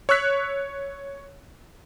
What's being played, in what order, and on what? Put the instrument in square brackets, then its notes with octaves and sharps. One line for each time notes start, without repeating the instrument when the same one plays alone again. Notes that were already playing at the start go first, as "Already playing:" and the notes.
[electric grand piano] C#5 C#6 E6 F#6 B6